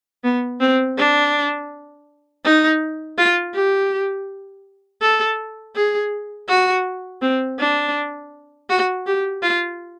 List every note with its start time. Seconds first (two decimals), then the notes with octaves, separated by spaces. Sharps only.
0.24 B3
0.60 C4
0.98 D4
2.45 D#4
3.18 F4
3.54 G4
5.01 A4
5.76 G#4
6.49 F#4
7.22 C4
7.60 D4
8.70 F#4
9.06 G4
9.43 F4